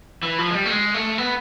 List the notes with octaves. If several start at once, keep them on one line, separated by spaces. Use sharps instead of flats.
E3
F3
G#3
G3
A3
G#3
A3
B3